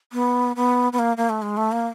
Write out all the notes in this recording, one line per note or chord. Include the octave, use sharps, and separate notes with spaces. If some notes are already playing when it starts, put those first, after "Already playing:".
B3
B3
B3
A#3
A#3
A3
G#3
A3
A#3